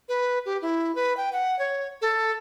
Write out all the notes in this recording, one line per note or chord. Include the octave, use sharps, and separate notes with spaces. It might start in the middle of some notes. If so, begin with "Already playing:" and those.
B4
G4
E4
B4
G5
F#5
C#5
A4